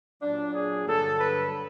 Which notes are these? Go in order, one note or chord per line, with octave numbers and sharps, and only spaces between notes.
A#2 F#3 D4
G#4
G2 D3 F#3 A4
B4